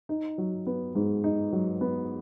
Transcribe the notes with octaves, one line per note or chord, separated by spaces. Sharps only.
D#4
F#3
B3
G#2
D#4
F#3
B3